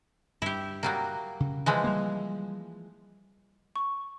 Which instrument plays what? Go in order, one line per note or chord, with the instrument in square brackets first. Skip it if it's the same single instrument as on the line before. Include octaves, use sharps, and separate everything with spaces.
[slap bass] G2 [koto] E4 G4
[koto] F#3 G3 A#3
[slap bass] C#3
[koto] E3 F3 G#3
[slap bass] G3 A#3
[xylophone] C#6